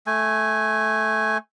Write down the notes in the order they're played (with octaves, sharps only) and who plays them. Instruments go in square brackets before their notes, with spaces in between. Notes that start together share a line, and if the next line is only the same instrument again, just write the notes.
[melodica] A3 G#5